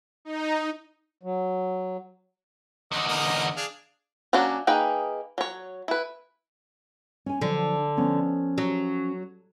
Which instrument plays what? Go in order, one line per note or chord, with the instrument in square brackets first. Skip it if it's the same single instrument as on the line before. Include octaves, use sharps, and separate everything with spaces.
[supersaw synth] D#4
[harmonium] F#3
[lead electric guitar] E2 D3 [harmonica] D#5
[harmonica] A#3 D#4 D#5
D4 G#4 F5
[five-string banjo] F#3 A#3 C#4 D4 F#4
A#3 D#4 G#4 B4 G5
F#3 C#5
E4 B4
[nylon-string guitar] C#4 G#5
[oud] D3 [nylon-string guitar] F3 F#3 D4
[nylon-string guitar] F3 B3 C#4
[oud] F#3